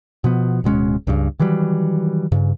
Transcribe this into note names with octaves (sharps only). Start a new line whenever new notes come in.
B2 F3 B3
D1 B2 G#3 C#4
C#2 G2 C#3
D#3 E3 F#3 G3
G2 C#3